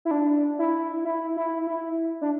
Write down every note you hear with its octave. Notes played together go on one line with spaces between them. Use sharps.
E4
D4
E4
E4
E4
E4
D4